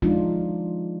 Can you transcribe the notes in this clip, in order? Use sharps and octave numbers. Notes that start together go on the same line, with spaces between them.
F3 G#3 D4 D#4 F4